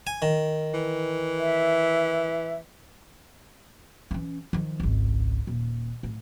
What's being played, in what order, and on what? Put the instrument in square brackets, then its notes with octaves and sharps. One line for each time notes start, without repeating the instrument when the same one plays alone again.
[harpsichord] G#5
D#3
[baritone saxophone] E3
[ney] E5
[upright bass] E3 C#4
D#3 F3
G#1 C#2
D#1
A2